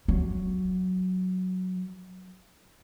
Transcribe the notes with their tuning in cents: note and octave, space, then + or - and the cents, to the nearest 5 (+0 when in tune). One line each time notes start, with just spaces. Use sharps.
F#3 +0